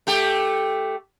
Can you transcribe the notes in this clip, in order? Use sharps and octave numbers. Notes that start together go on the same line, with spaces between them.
A3 G4